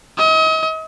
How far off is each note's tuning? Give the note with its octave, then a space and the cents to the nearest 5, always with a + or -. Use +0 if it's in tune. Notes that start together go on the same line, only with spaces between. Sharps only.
D#5 +40